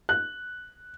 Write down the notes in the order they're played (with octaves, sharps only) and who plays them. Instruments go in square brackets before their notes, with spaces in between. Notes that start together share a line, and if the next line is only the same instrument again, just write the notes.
[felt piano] F#6